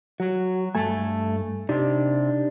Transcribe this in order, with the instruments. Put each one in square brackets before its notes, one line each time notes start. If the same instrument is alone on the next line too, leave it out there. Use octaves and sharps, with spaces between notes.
[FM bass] F#3 [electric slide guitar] F#4
[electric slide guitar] G2 A4 G#5 [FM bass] A3
[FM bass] C3 [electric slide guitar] D4 D#4 G4